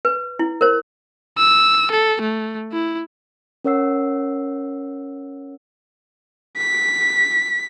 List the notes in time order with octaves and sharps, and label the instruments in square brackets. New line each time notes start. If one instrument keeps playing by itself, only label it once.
[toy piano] B4
E4
A#4 C5
[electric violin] E6
A4
A3
E4
[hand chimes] C#4 A#4 C#5 F#5 E6 C7
[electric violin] B6